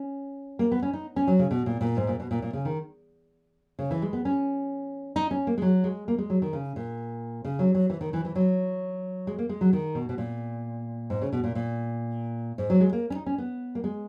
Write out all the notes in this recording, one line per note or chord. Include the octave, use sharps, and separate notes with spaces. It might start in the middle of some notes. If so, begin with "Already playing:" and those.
Already playing: C#4
A#3
B3
C#4
D#4
C#4
F#3
C#3
B2
A#2
A#2
G#2
A#2
B2
A#2
A#2
C#3
D#3
C#3
E3
G#3
B3
C#4
D#4
C#4
A#3
G#3
F#3
G#3
A#3
G#3
F#3
D#3
C#3
A#2
C#3
F#3
F#3
E3
D#3
E3
E3
F#3
G#3
A#3
G#3
F#3
D#3
B2
B2
A#2
G#2
C#3
B2
A#2
A#2
G#2
F#3
G#3
A#3
C#4
D#4
C#4
B3
A#3
G#3